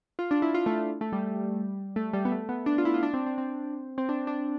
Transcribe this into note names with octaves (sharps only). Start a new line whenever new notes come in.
F4
D4
E4
F4
A3
A3
A3
G3
A3
G3
B3
A3
B3
D4
F4
E4
F4
D4
C4
C4
C4
C4
D4
D4